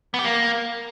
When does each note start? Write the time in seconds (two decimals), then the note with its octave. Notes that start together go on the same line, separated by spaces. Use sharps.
0.14 B3
0.19 G4
0.24 A#3